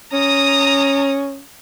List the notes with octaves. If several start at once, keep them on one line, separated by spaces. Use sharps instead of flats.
C#4 A#5 D#6